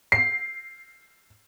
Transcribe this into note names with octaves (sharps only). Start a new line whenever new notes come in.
C7